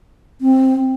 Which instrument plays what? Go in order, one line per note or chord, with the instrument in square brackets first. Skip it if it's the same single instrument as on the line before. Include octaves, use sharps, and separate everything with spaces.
[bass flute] C4